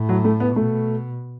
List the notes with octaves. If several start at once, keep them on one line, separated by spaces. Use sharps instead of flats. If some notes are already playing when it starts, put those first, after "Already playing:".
Already playing: A2
F#3
A3
B3
B2 A3